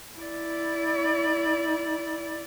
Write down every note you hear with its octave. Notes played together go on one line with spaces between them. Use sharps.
E4 D5